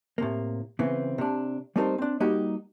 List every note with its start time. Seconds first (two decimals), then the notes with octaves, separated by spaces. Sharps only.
0.18 A2 C3 A#3
0.79 C#3 E3 B3 C4
1.18 C3 D4
1.76 G3 A3 C4 D#4 A#4 C5
1.98 C4 D4
2.20 G3 A#3 D#4 F#4 G4